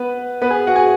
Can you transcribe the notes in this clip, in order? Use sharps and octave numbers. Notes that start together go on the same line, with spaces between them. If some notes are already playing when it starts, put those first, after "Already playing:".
Already playing: B3 B4
B3 B4
G#4
F#4 F#5
G#4 G#5